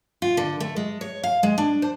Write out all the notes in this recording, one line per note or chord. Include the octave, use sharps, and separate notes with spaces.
F4
D3
A3
G#3
C#5
F5
G#3
D4
C5